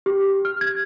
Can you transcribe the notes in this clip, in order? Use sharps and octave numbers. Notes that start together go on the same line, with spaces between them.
G4
F6
G#6